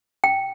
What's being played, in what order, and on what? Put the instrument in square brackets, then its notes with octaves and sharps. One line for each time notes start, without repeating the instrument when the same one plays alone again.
[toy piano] G5